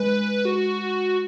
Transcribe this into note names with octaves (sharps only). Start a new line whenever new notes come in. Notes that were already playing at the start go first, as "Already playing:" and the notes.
Already playing: G#3 B4
F#4